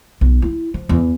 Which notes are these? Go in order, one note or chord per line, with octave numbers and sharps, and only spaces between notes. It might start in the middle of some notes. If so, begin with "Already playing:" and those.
B1
E4
F3
E2